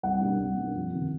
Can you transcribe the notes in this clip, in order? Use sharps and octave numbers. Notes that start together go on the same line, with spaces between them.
C2 F#5
B2 G3 A#3 D4
C2
B2 G3 A#3 D4
F2
C3 D#3